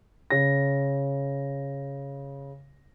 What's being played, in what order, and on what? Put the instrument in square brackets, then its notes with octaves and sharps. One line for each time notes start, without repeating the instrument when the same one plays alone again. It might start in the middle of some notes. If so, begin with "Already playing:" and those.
[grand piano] C#3 A#6